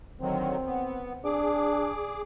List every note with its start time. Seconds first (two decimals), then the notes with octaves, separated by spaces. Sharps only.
0.21 D3 D#3 F#3 C4
0.66 B3
1.25 D4 G#4 D6